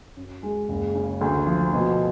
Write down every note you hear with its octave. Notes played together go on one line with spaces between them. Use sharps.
F#2
G#3
F#1
C#3
D2
F3
B2